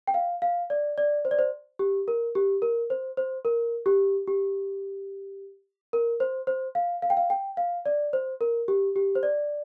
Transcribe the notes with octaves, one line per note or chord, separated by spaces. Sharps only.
G5
F5
F5
D5
D5
C5
D5
C5
G4
A#4
G4
A#4
C5
C5
A#4
G4
G4
A#4
C5
C5
F5
F5
G5
F5
G5
F5
D5
C5
A#4
G4
G4
C5
D5